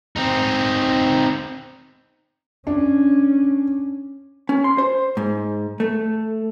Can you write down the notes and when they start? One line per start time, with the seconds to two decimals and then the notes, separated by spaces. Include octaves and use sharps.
0.17 C4 D#4
2.67 C#4 D4
4.49 C#4
4.64 C6
4.78 C5
5.17 G#2
5.80 A3